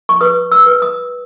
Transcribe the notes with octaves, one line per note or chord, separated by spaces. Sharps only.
C#6
B4 D#6
E6
B4
D#6